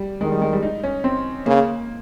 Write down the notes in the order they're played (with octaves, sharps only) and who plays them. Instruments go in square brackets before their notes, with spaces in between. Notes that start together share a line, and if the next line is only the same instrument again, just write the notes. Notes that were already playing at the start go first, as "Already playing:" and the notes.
Already playing: [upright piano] G3
[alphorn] D#3 [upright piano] G#3
[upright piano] G3
G#3
G3
D#4
C#4
C4
[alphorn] C#3 [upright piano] A#3